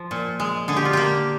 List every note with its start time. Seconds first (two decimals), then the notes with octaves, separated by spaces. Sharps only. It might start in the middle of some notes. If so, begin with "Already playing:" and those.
Already playing: F3
0.11 A#2
0.40 G#3
0.68 D3 G#4
0.76 G4
0.85 F4
0.93 A#3 G4